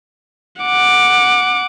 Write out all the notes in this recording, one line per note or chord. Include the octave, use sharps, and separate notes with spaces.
F#5 D6